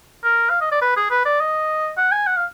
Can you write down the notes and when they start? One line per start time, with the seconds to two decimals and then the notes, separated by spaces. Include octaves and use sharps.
0.24 A#4
0.50 F5
0.61 D#5
0.72 D5
0.82 B4
0.97 G#4
1.11 B4
1.25 D5
1.40 D#5
1.97 F#5
2.12 G#5
2.27 F#5
2.36 F5